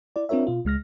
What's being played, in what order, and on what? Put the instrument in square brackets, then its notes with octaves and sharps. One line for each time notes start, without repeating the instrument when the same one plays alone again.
[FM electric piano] E4 D5
C4 D4 F4 A#4 C#5 E5
B2 F4
C#2 G#3 F6 A#6